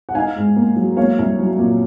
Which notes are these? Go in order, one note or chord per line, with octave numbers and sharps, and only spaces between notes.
F#5
D#4 F5 G#5
G#2
A#3
F#3
A#3 C#5 F5
C2
F#3
A#2